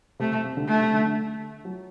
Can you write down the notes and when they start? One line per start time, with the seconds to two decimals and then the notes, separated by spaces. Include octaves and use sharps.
0.19 C3 A3
0.32 C3
0.44 C3
0.57 D3
0.68 A3
0.80 C3
0.93 D3
1.05 D3
1.65 F#3